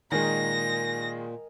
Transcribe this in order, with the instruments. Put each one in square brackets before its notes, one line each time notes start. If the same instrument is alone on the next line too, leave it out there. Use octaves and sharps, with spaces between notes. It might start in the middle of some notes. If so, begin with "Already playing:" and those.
[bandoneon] A#2 [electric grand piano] D#3 G#3 [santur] A#4 D#5 G#5 [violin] A#6